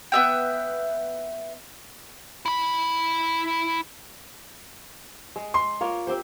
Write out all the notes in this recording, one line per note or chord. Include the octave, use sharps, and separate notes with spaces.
B3 E5 G5
E4 B5
G#3
C6
A#3 F4 C#5
C4 G4 C5